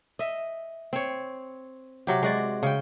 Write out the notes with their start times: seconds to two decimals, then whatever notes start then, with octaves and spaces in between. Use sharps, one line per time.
0.19 D#5 E5
0.93 C4 C#5
2.07 C3 F#3 G4
2.23 G#3 F#4 D5
2.63 C#3 G5